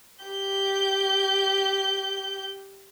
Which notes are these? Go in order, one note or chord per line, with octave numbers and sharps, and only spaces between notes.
G4 G6